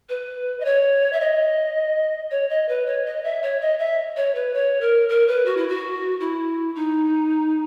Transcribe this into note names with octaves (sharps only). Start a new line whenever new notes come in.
B4
D#5
C#5
E5
D#5
C#5
D#5
B4
C#5
D#5
E5
C#5
D#5
E5
C#5
B4
C#5
A#4
A#4
B4
F#4
E4
F#4
E4
D#4